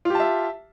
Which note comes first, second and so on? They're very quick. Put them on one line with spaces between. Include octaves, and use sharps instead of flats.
F4 G4 A5 E5